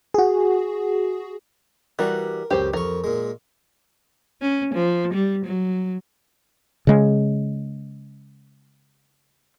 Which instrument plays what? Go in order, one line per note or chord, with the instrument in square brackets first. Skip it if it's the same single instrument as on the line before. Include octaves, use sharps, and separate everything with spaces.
[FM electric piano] F#4 G#4
[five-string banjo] E3 G3 F#4 [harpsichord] A#4
[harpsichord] C#2 F#2 [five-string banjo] G4 C5
[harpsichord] F2 C#6 [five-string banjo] A#4
[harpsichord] A#2 G#3
[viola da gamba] C#4
F3
G3
F#3
[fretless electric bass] C#3 G#3